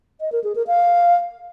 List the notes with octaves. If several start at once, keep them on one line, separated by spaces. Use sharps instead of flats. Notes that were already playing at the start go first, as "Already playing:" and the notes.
D#5
A#4
G#4
A#4
F5